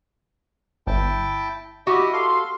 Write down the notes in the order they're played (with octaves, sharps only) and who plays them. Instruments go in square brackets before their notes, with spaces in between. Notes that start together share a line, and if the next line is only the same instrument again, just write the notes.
[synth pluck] G1 [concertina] E4 G5 A5
[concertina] E4 D#5 [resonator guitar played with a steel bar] F#4 G4
[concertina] A4 F5 F6 [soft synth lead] C6